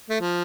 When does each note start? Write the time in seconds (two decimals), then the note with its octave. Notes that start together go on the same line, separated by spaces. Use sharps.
0.10 A3
0.21 F3